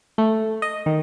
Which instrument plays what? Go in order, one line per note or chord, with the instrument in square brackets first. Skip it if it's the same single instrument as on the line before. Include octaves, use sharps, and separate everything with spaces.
[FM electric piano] A3
D#5
D#3